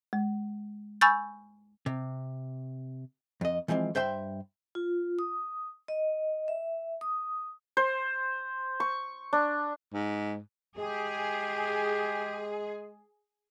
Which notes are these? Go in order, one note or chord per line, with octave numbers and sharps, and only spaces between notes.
G#3
G#5 B5 C#6 E6 G6 A6
C3
F2 D#5
E3 F3 G#3 A#3 C4
G2 C5 E5 G5 C6
F4
D#6
D#5
E5
D#6
C5
C#6
D4
G#2
G#3 G4 G#4